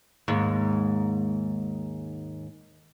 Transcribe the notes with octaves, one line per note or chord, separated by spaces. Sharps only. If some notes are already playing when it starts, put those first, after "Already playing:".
D#2 G#2